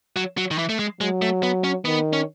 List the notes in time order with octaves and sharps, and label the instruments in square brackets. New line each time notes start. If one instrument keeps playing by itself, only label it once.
[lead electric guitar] F#3
F#3
D#3
E3
A3
G#3
[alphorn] F#3 [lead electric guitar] G#3
[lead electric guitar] A3
B3
C#4
[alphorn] D#3 [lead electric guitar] B3
[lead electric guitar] C#4